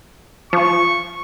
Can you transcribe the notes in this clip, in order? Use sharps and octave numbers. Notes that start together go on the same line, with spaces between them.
F3 C#6